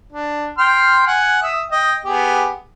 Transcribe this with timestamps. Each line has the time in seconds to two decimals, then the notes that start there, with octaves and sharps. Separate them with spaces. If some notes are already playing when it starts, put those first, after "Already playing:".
0.12 D4
0.58 G5 C6 F6
1.07 F#5 G#5
1.43 E5 D#6
1.71 D#5 G5
2.05 B3 G4 G#4